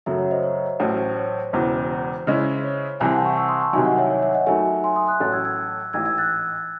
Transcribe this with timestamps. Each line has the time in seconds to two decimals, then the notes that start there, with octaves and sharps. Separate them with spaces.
0.06 F#2 C#3 F#3 A3 C#5 E5
0.19 C#5
0.31 C5 D#5
0.43 C#5
0.80 A1 A2 F#3 C#4 C5
0.98 C5
1.17 C#5
1.53 E1 E2 C#3 E3 C5
2.27 C#3 G#3 C#4 E4
2.64 C#5
3.00 C2 C3 E3 C4 E5 G#5
3.12 F#5 A5
3.24 A5 C#6
3.36 C#6 E6
3.48 C6 D#6
3.61 A5 C#6
3.73 C2 C3 D#3 F#3 E5 G#5
3.85 D#5 F#5
3.98 C#5 E5
4.10 C#5
4.22 C#5 E5
4.34 D#5 F#5
4.47 D#2 D#3 F#3 A3 E5 G#5
4.84 G#5 C6
4.96 C6 D#6
5.08 D#6 F#6
5.20 A1 A2 F#3 A3 C#4 F#6 A6
5.32 E6 G#6
5.45 E6 G#6
5.93 A1 G#2 E3 E6 G#6
6.05 E6 G#6
6.18 F#6 A6